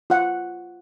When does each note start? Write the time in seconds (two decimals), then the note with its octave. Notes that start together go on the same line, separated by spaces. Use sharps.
0.10 F4 F#5